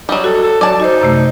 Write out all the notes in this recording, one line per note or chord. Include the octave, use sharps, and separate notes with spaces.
F#3 G3 D#5
F#4 A4
A4
F#3 D5 A5
D#4 F#4 C5
F#2 C3 A3